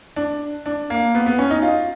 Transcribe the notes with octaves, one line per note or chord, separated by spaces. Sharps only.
D4
D4
A#3
B3
B3
C#4
D#4
F4